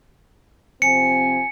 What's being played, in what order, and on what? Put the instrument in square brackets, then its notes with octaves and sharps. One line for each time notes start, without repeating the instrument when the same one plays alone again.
[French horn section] C3 F3 C4 [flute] G#5 [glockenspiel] C#7